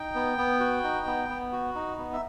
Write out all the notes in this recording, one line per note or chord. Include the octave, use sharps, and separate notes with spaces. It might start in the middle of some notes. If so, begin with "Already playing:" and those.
Already playing: D#4 G5
B3
B3
F#4
D#4
B3
B3
F#4
D#4
B3
E5